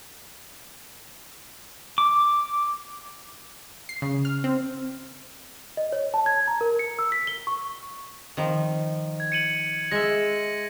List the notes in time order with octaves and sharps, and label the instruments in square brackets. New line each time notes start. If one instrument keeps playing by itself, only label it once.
[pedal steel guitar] D6
[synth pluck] C7
C#3
F6
C4
[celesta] D#5
C#5
A5
G#6
A#5
A#4
C#7
E6
B6
G7
C#6
[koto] D#3 F3
[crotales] G#6
C#7 D#7 F#7
[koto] G#3 E5 [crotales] A#6